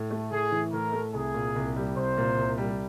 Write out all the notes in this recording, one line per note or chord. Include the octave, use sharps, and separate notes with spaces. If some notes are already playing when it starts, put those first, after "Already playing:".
Already playing: A2
A3
A2 G#4
E3
A2 A#4
A3
C2 G#4
A#2
C2
G3
C2 C5
A#2
C2
G3